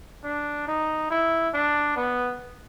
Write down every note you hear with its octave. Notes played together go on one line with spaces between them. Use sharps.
D4
D#4
E4
D4
B3